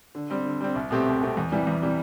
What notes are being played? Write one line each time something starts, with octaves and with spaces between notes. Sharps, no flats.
D3
G3 C4
D3
G3 C4
C2
B2 A3 C4 G4
C2
B2 A3 C4 G4
E2
C3 E3 G3
E2
C3 E3 G3